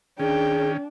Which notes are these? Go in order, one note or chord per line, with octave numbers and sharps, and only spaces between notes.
D#3 C#4 D4 G#4 G5